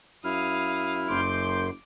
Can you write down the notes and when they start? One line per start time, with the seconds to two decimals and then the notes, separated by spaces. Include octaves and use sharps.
0.24 F#2 E4 F5 D#6 F6
1.09 F#1 F#2 C6 D6 G6